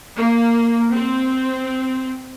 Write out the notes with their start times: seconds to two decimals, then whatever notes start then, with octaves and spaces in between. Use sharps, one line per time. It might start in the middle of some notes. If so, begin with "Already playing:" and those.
0.17 A#3
0.94 C4